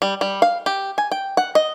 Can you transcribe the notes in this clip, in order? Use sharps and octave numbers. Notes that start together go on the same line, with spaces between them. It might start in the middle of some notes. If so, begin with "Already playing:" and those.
G3
G3
F5
G4
G#5
G5
F#5
D#5